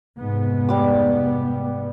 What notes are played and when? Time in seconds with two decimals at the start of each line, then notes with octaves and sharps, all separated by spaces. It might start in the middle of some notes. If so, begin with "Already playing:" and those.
0.17 F1 G#2 B3
0.69 G3 D6